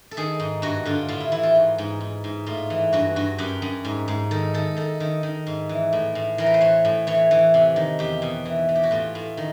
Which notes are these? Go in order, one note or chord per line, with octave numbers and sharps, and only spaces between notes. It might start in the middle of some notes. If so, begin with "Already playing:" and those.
A4
D#3 G#4
G#2
G2 F#4
D3 F4
A2 F4
E4
E3 E4
F4
G#2
G#2
G#2
G#2
A2 F4
E3
G2 F#4
G2 F#4
F#2 G4
F#2
G#2
G#2
D#3 A4
D#3 A4
D#3 A4
D#3
D#3
G#2
E3
A2
A2
E3 A#4
B4
C5
E3 C#5
A2
E3 C#5
E3
C3
D#3
E2 G4
B2
E3
E3
G4
F#4
A2 F4
A2
D#3